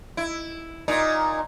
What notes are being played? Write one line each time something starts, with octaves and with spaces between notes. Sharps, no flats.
E4
A#2 D#4